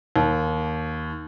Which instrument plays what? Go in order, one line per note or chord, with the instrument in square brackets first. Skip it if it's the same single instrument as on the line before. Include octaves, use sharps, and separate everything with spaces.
[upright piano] D#2